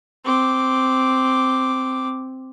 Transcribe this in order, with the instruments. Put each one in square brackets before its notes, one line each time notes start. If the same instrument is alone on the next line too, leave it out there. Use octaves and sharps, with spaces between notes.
[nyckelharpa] C4 D6